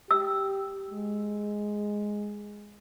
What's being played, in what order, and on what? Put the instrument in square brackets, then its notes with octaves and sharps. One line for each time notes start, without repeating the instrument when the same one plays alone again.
[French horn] G4 [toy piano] E6
[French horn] G#3